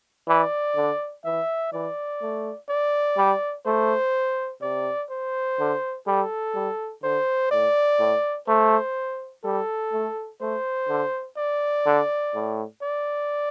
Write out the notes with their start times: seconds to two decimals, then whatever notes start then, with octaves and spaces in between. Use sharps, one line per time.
0.28 E3 D5
0.76 D3
1.25 E3 E5
1.73 E3 D5
2.22 A3
2.69 D5
3.17 G3
3.66 A3 C5
4.62 C3 D5
5.11 C5
5.59 D3
6.07 G3 A4
6.55 G3
7.03 D3 C5
7.51 A2 D5
7.99 A2
8.48 A3 C5
9.44 G3 A4
9.93 A3
10.41 A3 C5
10.89 D3
11.37 D5
11.86 D3
12.34 A2
12.82 D5